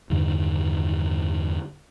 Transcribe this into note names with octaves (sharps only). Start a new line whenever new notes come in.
E2 G2 D3 D#3